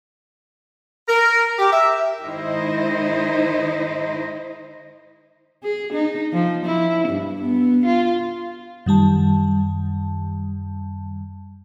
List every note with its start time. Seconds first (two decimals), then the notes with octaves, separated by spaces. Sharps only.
1.08 A#4
1.59 G4
1.72 E5
2.25 D#3 G#3 D#4 E4 C5 D#5
5.63 G#4
5.93 D#4
6.33 F3
6.65 E4
7.08 G2
7.41 B3
7.85 F4
8.86 F#2 D#3 G3 A5